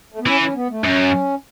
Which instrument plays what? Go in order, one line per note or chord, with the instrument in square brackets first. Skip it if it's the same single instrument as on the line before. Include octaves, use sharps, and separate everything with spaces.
[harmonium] A3
B3
[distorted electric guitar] E3 [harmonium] C#4
[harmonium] C#4
B3
A3
[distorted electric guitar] F#2 [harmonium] C#4